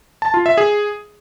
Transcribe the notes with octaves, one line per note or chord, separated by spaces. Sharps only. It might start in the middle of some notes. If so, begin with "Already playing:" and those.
A5
F4
E5
G#4